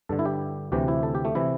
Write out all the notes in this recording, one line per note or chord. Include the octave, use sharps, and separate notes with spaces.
G2 D3 A4
E4
G4
D2 C3 E3 G4
E4
A4
G4
A3
C3 E3 E4